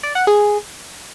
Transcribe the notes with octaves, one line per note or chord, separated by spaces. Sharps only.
D5
F#5
G#4